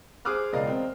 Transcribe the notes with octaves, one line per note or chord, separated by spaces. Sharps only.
G#4 C5 D6 D#6 F6 F#6
E1 C#2 A#4 D5 D#5 F5
C4 A#4